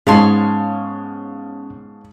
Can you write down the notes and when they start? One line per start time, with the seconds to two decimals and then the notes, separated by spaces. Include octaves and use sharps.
0.07 G#2 B3 C#4 C#5 F5 A5 C6